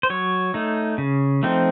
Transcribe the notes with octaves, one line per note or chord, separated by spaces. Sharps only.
C5
F#3 C#5
A3 D#4
C#3
F3 A3 C4 D#4